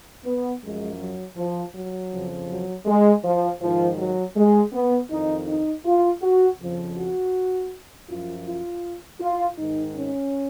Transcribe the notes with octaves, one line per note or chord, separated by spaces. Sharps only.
B3
F#2 F3 G#3
F#3
F3
F#3
F2 C#3 F3
F#3
G#3
F3
G#2 D#3 F3
F#3
G#3
B3
F2 D#3 D#4
D#4
F4
F#4
F2 C#3 F3
F#4
F#2 F3 F4
F4
F4
G#2 D#3 D#4
C#4